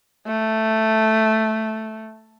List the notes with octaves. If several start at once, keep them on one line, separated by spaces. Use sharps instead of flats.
A3